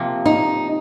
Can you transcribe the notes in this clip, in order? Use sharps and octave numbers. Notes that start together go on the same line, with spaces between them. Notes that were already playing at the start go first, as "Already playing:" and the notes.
Already playing: C3 F3 A#3
D#4